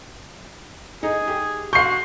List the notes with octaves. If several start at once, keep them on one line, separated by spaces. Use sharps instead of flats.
D#4 G#4
G4
F#4 F5 C6 C#6 G6 C7